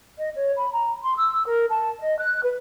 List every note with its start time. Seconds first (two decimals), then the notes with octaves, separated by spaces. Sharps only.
0.18 D#5
0.35 C#5
0.57 B5
0.72 A#5
1.03 C6
1.16 E6
1.45 A#4
1.69 A5
2.00 D#5
2.18 F#6
2.43 B4